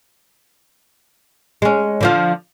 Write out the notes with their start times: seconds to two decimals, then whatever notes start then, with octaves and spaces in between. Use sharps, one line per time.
1.62 G#3 C#4
2.01 D3 F3 F4